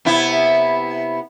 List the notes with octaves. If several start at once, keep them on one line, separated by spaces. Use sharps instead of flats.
C3 B3 E4